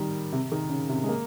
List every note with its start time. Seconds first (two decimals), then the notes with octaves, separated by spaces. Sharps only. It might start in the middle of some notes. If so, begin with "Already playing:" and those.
Already playing: D#3 G3
0.33 C3
0.52 D#3
0.70 C#3
0.89 C3
1.04 G#3
1.09 A#3